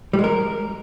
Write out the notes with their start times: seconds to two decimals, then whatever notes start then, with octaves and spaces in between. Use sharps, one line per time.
0.13 G3
0.19 G#3
0.24 A#4